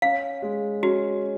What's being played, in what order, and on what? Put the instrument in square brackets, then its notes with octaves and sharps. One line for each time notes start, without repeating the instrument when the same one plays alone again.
[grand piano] C#4 [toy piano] F5
[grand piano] G#3
[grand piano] C#4 [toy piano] F#4